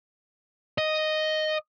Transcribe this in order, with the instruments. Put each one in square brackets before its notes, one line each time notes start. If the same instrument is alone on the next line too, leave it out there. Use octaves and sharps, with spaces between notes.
[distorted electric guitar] D#5